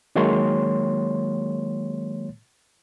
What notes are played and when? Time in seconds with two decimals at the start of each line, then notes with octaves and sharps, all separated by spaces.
0.15 D#3 F#3 G#3 A#3 C#5 C6